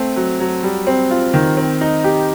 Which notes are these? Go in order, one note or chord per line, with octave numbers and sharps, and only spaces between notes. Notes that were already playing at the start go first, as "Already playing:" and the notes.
Already playing: A3 C4
F#3
F#3
G3
C4
F4
D#3
C4
D#4
G4